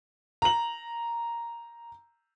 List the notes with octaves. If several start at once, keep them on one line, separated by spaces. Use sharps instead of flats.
A#5 F#7